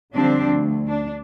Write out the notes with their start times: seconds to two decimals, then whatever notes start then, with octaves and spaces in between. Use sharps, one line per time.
0.14 D3 F3 G3 C4 D4
0.45 D2
0.88 D4